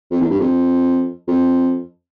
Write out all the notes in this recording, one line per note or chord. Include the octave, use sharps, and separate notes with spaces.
F2
E2
G2
F2
F2